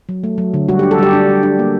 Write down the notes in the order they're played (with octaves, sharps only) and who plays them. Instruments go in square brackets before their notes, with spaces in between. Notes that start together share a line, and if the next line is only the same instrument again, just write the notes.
[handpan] F#3
A3
F#3
D3
G3 F#4
G4
D4
A4
G3 G4
D4
G3
D4
A#3